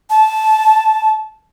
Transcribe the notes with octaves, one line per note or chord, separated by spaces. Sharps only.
A5